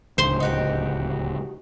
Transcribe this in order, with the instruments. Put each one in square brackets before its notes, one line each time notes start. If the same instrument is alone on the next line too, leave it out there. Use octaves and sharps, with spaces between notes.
[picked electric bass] D1 C#2 [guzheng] C5 C6
[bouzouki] D#4 F#4 G4